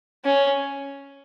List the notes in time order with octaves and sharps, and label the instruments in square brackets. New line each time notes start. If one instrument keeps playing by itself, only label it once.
[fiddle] C#4